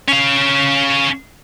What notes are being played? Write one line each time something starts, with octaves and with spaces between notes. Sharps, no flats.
C#4 F5